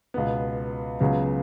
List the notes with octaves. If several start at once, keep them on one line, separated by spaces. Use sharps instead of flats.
C#2 B2 B3
C#2 C#3 F#3 B3 F#4